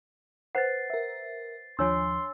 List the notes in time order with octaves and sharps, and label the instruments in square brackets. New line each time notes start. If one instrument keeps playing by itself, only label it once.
[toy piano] B4 C5 F#5 [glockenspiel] A6 C7
[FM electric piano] A#4 E5
[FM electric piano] D#2 F3 [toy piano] D4 C#5 G#5 [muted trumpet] C6 [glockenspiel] E6